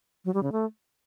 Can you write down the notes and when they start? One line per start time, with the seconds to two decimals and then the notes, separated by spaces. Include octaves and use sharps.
0.25 F#3
0.34 G3
0.43 C#3
0.52 A3